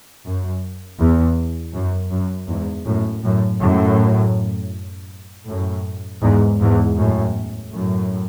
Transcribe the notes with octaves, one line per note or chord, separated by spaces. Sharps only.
F#2
E2
F#2
F#2
E2 G#2
F#2 A2
F#2 A2
F#2 A2
F#2 A2
E2 G#2
E2 G#2
F#2 A2
F#2 A2